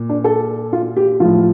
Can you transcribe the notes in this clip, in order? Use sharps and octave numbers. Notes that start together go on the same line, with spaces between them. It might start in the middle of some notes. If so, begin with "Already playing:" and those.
Already playing: A#2
D4
A4
F4
G4
A2 F3 F4